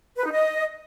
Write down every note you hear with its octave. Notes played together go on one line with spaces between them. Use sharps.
B4
D#4
D#5